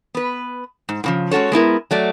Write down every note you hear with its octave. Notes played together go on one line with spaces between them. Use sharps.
B3 B4
G#2
A2 C#3 F3
G#3 C#4 F#4 A4 C#5
G#3 B3 E4 A#4
F#3 A3 D5